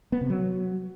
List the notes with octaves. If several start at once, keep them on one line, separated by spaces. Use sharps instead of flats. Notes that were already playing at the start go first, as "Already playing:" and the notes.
B3
C3
F#3